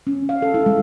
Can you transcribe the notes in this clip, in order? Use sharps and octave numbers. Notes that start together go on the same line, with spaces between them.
C#4
F5
A4
E4
G#3